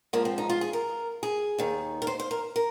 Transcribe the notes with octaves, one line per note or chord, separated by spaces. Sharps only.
G#2 F3 A#3
C4
D#4
F4
G#4
A#4
G#4
D#2 D#3
A#4
C5
C5
A#4
A#4